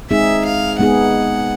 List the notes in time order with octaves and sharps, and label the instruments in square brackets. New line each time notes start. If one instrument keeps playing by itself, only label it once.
[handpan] G#3 C4 D#4 G#4 [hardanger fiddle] E5
[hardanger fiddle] F5
[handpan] G#3 B3 D#4 G#4 [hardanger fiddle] F#5